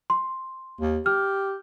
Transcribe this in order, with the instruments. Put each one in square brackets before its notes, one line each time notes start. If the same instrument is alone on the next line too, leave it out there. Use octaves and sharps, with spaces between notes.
[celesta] C6
[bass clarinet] D#2
[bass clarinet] G4 [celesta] F6